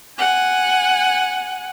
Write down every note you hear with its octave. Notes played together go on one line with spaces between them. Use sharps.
F#5 G#5